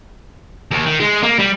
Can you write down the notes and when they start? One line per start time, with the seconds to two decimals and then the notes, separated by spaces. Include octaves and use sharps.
0.71 D#2
0.86 D#3
1.00 G#3
1.23 A#3
1.39 G3